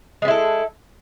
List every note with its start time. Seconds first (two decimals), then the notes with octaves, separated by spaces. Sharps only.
0.22 G#3
0.25 B3
0.28 E4
0.31 A4